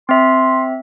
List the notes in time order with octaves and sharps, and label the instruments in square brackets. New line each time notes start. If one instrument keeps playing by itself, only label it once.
[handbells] C4 E5 [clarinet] C6